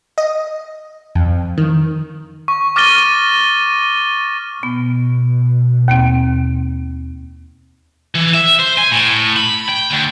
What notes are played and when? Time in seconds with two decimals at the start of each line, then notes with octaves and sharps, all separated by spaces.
0.18 D#5
1.15 F2
1.58 D#3
2.48 C#6
2.76 D6 F6 A6 A#6 D#7 G7
4.63 B2 B3
5.88 D#2 A#3 C4
8.15 E3
8.35 E5
8.60 C5
8.78 G#5
8.91 A2
9.37 B5
9.69 G5
9.92 D2